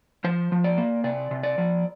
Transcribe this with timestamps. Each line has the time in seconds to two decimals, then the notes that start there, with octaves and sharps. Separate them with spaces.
0.24 F3 C5
0.52 F3
0.64 D5
0.78 A#3
1.04 C3 D5
1.31 C3
1.43 D5
1.58 F3